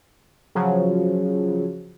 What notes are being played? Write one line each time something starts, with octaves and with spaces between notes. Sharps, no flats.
C#3 F3 F#3